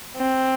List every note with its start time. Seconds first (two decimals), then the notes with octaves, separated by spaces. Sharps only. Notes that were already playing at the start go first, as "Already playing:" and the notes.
0.16 C4